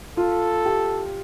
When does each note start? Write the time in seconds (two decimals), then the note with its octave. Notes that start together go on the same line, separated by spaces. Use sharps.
0.17 F4 A4
0.66 G4